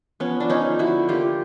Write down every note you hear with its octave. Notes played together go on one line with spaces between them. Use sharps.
F3 B3 C#4
F3 D4
C#4 D#4
D3
E4 F#4
D3
A#3 F4 G4